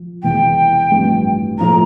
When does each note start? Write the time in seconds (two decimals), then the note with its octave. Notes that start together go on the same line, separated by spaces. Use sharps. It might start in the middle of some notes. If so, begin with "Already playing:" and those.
Already playing: F3
0.23 E1 E2 C3 G5
0.92 A1 G2 F3 C4 G4
1.58 A2 F3 A3 A#5